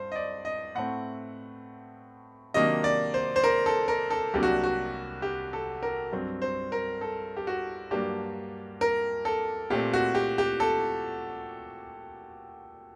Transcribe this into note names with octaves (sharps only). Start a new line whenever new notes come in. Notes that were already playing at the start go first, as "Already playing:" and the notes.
Already playing: G2 C5
D#5
D5
D#5
A2 A3 C4 F#5
C3 D#3 F#3 A#3 D4 D#5
D5
C5
C5
A#4
A4
A#4
A4
C2 C3 F#3 A#3 D4 G4
F#4
F#4
G4
A4
A#4
G2 F#3 C4
C5
A#4
A4
G4
F#4
G2 F#3 A#3 D4 G4
A#4
A4
A#2 A3 C4 G4
F#4
G4
G4
A4